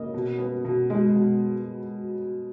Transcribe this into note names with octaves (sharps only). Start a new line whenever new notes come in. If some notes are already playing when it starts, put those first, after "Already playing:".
Already playing: C#3 A#3 D#5
B2
B3
B2
G#3
B2